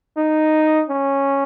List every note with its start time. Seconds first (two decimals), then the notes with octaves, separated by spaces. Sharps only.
0.17 D#4
0.89 C#4